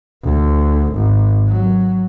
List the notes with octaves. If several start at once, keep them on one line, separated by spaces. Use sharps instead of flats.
D2
G#1
F#3